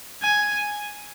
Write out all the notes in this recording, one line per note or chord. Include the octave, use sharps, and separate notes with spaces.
G#5